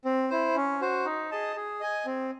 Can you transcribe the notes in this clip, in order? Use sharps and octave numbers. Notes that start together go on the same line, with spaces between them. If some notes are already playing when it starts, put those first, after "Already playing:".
C4
E4 C5
C#4
F#4 C5
D#4
G#4 D#5 A5
G#4
D#5 G#5
C4